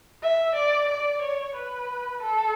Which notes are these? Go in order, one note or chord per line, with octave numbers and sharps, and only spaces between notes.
E5
D5
D5
C#5
B4
A4